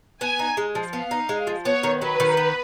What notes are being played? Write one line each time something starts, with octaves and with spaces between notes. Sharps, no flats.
B3 G#5
D#4
G#3
F3
B3 F5
D#4
G#3
F3
B3 C#5
D#3
F#3 B4
D#3
B3